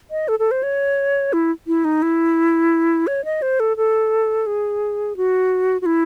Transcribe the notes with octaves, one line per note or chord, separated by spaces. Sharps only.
D#5
A4
A4
C5
C#5
E4
E4
D#4
E4
C#5
D#5
C5
A4
A4
G#4
F#4
F#4
E4